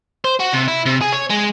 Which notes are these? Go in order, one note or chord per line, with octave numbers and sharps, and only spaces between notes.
C5
F#4
C3
E4
C3
G#4
C#5
G#3